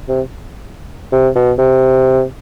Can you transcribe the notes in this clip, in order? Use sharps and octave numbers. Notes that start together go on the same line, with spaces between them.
C3
C3
B2
C3